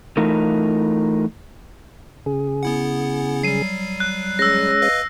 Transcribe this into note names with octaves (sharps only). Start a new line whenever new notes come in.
E3 A3 D#4 F4 A#4
C#3 G#4
B3 E4 F#5
F#3 G3 C7 D#7
F#6
G#3 C#4 E6 A#6
B4 D#5 F5